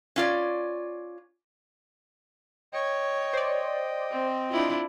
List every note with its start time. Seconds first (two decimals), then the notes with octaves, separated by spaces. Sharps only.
0.16 C#4 F4 D5
2.73 C#5 D#5 G5
3.33 C5 D5
4.11 C4
4.51 D4 E4 F4